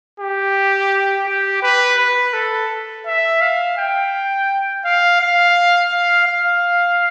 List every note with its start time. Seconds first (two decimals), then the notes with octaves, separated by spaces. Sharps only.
0.20 G4
1.26 G4
1.62 B4
1.98 B4
2.34 A4
3.06 E5
3.41 F5
3.77 G5
4.85 F5
5.20 F5
5.92 F5
6.28 F5